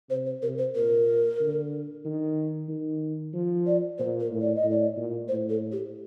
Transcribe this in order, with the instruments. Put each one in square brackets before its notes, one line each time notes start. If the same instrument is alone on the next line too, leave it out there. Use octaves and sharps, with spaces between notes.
[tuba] C3 [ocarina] C5
[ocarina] C5
[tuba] C3 [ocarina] A#4
[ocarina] C5
[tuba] A#2 [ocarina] A#4
[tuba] D3
D#3
D#3
F3
[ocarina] D5
[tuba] A#2 [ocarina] C5
[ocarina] A#4
[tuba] A2
[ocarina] D5
D#5
[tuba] A2
[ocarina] D5
[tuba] A#2
[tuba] A2 [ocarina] C5
[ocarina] A4
G4